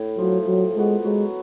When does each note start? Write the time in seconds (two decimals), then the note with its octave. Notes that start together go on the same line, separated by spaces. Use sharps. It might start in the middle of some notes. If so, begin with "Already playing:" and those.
Already playing: A2
0.18 F3 F#3 A3
0.47 A2 F#3
0.76 F3 G#3 B3 F#4
1.04 F#3 G#3